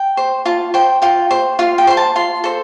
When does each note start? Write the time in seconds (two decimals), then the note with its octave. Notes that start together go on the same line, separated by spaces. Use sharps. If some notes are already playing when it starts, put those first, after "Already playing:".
Already playing: G5
0.17 C5
0.45 F4 A5
0.74 C5 G5
1.02 F4 G5
1.31 C5
1.59 F4 F5
1.78 G5
1.87 C5 C6
1.97 A5
2.16 F4 C6
2.44 A4 C5